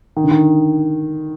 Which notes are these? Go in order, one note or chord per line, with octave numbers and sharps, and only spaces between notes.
D#3
D3
D#3